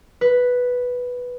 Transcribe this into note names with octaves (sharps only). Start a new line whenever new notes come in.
B4